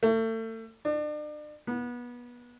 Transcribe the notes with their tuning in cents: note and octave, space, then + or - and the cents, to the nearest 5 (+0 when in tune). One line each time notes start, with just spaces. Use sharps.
A3 +35
D4 +35
B3 -25